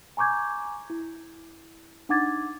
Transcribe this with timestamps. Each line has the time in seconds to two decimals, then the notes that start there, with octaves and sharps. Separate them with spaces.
0.17 G#5 A#5 C#6 D6 G6 G#6
0.90 E4
2.09 D4 D#4 F#5 D6 G#6 A6